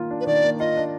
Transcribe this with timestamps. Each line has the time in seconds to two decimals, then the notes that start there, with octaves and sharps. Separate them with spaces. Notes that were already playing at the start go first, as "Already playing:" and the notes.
Already playing: D#3 A#3 F4
0.11 D4
0.21 B4
0.27 D#3 D5
0.43 A#3
0.59 F4 D#5
0.77 D4